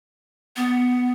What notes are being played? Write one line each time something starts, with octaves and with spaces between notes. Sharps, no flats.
B3